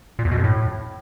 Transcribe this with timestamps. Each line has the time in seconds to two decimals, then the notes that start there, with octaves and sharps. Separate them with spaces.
0.19 A#2
0.25 E2
0.31 B2
0.38 F2
0.44 A2